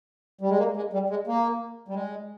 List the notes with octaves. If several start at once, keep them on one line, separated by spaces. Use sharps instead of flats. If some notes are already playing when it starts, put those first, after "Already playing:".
G3
G#3
A#3
G#3
G3
G#3
A#3
G3
G#3